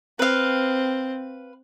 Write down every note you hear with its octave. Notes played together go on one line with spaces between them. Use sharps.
C4 B4 F5